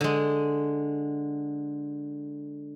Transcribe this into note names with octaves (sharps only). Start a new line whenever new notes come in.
D3 G#3